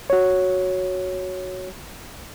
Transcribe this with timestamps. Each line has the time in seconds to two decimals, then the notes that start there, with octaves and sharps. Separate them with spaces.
0.10 F#4 C#5